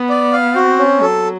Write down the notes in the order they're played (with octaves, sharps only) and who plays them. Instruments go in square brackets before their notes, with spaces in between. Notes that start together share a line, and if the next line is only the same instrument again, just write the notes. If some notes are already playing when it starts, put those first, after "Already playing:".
Already playing: [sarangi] B3
[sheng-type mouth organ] D5
F5
[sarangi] C4 [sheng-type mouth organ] F#4
[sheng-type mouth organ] C#4
[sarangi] F#3 [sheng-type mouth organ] A4